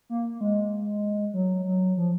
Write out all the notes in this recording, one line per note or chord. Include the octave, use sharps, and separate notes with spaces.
A#3
G#3
F#3
F#3
F3